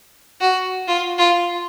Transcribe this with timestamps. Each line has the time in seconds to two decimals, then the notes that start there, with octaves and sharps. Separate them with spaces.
0.41 F#4
0.87 F4
1.18 F4